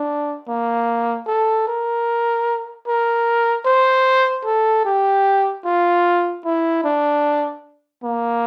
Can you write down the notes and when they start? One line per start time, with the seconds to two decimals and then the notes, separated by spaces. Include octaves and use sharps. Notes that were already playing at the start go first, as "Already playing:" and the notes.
Already playing: D4
0.48 A#3
1.27 A4
1.68 A#4
2.87 A#4
3.66 C5
4.45 A4
4.85 G4
5.65 F4
6.44 E4
6.84 D4
8.03 A#3